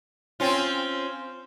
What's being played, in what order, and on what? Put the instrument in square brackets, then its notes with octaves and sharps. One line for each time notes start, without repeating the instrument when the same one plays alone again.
[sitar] C4 C#4 F4